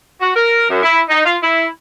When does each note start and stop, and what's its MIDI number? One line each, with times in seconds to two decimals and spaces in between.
0.21 0.33 66
0.36 0.68 70
0.70 0.79 42
0.83 1.01 64
1.09 1.21 63
1.25 1.36 65
1.43 1.66 64